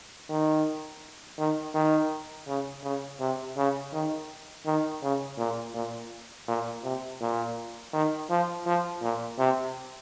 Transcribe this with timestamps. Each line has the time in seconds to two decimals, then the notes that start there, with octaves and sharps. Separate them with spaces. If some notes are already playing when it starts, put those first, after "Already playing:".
0.30 D#3
1.39 D#3
1.75 D#3
2.47 C#3
2.83 C#3
3.20 C3
3.57 C#3
3.93 D#3
4.66 D#3
5.03 C#3
5.38 A#2
5.74 A#2
6.48 A#2
6.83 C3
7.21 A#2
7.93 D#3
8.30 F3
8.66 F3
9.02 A#2
9.39 C3